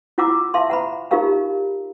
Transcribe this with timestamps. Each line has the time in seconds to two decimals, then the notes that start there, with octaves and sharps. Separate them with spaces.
0.18 E4 F4 F#5 A#5 D6 E6
0.54 E5 F5 A5 C6
0.69 F#5 A#5 B5
1.11 D#4 F4 G4 A#4 F5 A#5